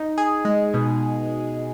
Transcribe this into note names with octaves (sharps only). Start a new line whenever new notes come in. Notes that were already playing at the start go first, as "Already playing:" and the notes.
Already playing: D#4
G#4
G#3
B2